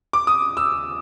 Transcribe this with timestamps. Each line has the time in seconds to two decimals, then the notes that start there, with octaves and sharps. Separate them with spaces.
0.13 D6
0.27 D#6
0.57 E6